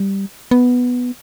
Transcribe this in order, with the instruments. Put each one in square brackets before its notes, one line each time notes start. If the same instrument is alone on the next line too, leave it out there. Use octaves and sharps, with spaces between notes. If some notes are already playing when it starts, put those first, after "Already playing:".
Already playing: [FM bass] G3
B3